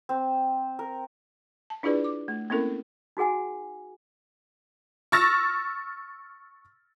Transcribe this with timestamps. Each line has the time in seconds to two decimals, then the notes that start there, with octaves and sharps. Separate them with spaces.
0.09 C4
0.79 A#4
1.70 A5
1.83 D4 E4 F4 G#4 B4 D5
2.04 D6
2.28 A3
2.50 A#3 C4 C#4 E4 A4 A#4
3.17 D#4 F#4 G#4 F#5 G#5
5.12 C#6 E6 F6 A6 A#6